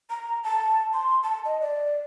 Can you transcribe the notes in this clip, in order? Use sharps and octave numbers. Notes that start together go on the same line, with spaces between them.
A#5
A5
C6
A5
D#5
D5